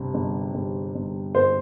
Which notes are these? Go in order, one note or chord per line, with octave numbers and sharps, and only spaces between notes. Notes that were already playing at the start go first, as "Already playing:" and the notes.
Already playing: G1 C3
G1
G1
G1
G1 C5